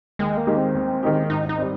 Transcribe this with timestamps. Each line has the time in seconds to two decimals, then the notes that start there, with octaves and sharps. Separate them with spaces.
0.19 D#2 G#3
0.37 A#3
0.47 D#3 G#3 D#4 G4
0.57 C4
0.75 D#2
1.03 D#3 G#3 D#4 G4
1.30 G#2 D#4
1.49 D#4
1.58 G3 C4